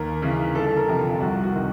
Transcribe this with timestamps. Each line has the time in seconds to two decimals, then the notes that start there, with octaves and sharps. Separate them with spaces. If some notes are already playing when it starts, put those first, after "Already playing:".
Already playing: D#2 A#4
0.22 C#3 E3
0.55 G1 A4
0.77 A#4
0.88 F2 C3
0.99 F4
1.21 C2 F#4
1.43 F#4
1.54 C3 D#3